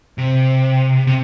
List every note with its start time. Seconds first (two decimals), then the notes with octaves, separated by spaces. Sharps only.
0.18 C3
1.07 C3